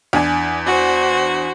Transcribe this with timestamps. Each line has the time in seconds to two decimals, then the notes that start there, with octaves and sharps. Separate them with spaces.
0.13 E2 D4 G#5
0.67 F#4 C5